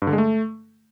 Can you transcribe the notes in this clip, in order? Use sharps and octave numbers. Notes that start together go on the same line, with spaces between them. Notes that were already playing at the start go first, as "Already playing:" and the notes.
G2
D3
G#3
A3